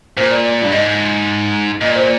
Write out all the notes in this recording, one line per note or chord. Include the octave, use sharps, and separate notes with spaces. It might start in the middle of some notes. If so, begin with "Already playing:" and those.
A#2 C5
D5
D5
D5
G2
G#2 D#5
A#2 D#5
D5
C5
D5